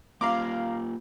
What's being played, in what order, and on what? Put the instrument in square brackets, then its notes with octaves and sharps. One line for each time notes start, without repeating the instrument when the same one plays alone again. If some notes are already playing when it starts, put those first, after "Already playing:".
[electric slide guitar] A#3 F4 G4 [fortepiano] F5 A#5 D6